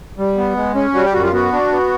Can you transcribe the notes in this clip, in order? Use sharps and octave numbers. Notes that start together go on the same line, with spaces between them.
G3
B3
G#3
C#4
G3 F#4
G4
F#2 F#4
F4
B3 F#4
D4
B3